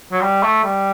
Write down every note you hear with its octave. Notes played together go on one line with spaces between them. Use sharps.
F#3
G3
A3
G3